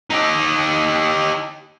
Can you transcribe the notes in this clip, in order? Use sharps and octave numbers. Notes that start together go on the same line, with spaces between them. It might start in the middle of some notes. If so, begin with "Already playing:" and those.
D#4 G4